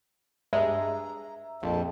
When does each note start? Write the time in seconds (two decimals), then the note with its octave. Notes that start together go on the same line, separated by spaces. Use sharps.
0.53 G2 G#3 E5 A#5
1.63 A#1 F2 A5